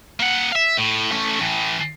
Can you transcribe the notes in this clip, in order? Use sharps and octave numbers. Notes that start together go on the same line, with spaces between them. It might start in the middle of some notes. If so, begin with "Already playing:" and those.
A#3 F#5
E5 F5
A2
A3 C#4
A2 E3